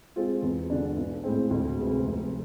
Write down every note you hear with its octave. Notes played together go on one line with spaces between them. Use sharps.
G#3 C4 F4
E2
D3 G#3 D4
B1
A2 G#3 C4
D2
C3 G#3 B3
F1